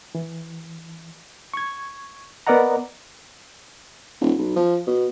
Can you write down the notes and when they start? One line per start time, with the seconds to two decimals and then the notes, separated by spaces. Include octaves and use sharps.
0.15 E3
1.54 C#6 G#6
2.47 B3 A#4 D5 D#5 F#5 A#5
4.21 D#1
4.38 B1
4.56 F3
4.87 B2